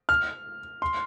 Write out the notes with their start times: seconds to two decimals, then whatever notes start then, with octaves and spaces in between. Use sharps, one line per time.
0.09 F6
0.82 C6